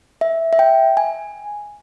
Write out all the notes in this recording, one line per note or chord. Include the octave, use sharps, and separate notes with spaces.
E5
E5
G5
G#5